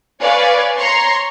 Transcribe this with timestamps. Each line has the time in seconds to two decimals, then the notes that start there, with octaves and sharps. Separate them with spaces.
0.22 B4 C#5 D5 F5 G#5
0.79 C#5 A#5 C6 C#6